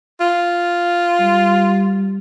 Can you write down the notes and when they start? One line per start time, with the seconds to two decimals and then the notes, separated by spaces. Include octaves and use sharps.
0.20 F4
1.20 G3